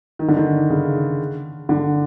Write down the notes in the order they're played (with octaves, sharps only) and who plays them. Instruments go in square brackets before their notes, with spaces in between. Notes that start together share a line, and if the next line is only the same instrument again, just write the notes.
[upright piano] D#3
D3
D#3
C#3
D3